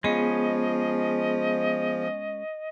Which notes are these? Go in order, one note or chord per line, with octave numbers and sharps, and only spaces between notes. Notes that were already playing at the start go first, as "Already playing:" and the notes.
F3 G#3 B3 C#4 G#4 D#5